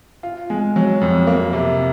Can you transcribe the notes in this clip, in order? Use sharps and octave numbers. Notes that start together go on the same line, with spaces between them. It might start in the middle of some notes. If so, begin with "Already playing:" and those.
F4
G#3
F#3
F2
A#3
C3